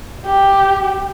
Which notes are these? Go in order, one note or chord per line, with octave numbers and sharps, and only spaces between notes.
G4